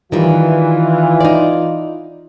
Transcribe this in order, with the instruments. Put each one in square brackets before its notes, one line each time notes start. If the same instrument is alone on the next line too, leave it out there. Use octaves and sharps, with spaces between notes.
[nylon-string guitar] D#3 G3 [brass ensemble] E3 [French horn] F4
[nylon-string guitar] D#4 D5